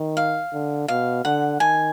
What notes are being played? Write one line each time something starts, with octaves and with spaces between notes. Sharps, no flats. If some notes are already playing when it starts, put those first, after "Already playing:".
Already playing: D#3
F5
D3
B2 F5
D3 F#5
D#3 G#5